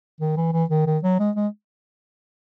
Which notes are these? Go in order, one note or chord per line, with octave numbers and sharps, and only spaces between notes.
D#3
E3
E3
D#3
D#3
F#3
G#3
G#3